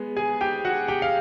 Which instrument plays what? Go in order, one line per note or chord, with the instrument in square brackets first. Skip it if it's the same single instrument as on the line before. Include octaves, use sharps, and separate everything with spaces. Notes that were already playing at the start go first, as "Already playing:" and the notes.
Already playing: [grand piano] G#3 B3
G#4 G#5
G4 G5
F#4 F#5
G4 G5
F5